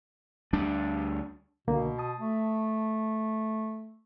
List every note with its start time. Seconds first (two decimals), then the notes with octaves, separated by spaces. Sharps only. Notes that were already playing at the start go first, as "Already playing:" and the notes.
0.53 D2 G3 D4
1.68 C2 B2 D3 A#3
1.98 A5 D#6
2.19 A3